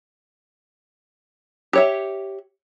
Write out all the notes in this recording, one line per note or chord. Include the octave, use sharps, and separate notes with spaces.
G4 C#5 E5